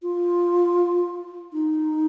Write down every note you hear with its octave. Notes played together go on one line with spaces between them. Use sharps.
F4
D#4